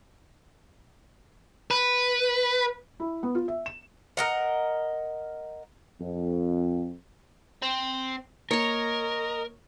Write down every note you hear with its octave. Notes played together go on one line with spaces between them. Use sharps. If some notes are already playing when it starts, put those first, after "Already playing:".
B4
E4
B3
F4
E5
E7
A#4 D#5 F#5
F2
C4
A#3 A#4 C#5 D#5 A#5 C#6